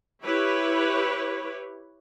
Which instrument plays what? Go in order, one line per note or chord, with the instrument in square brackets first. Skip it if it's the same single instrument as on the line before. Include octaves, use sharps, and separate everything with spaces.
[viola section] E4 G4 B4 C#5